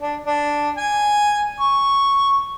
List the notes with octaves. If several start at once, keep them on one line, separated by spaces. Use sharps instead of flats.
D4
D4
G#5
C#6